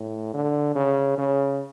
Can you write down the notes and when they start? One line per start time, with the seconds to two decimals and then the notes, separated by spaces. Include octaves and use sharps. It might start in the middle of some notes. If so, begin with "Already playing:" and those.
Already playing: A2
0.34 D3
0.75 C#3
1.18 C#3